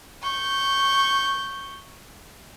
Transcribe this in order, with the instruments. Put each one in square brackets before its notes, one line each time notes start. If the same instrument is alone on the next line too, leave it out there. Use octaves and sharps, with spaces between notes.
[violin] C#6 G6